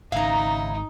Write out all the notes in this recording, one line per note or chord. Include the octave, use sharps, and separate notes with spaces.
G#1 C#3 D#4 E4 F5 A#5